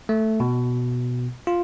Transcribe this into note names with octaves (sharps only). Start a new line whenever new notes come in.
A3
B2
F4